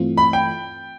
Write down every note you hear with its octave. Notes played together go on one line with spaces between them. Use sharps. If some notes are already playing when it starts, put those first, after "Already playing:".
Already playing: G2 E3 A3 C4 F4
B5
G5